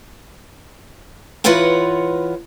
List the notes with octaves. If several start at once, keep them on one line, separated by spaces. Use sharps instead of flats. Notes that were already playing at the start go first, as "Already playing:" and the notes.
E3 F4 B4 C#5 F#5 A#5